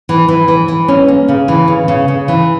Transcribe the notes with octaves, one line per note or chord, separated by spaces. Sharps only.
E3
E3
E3
E3
C#4
A#3
C#3
E3
C#3
C#3
C#3
E3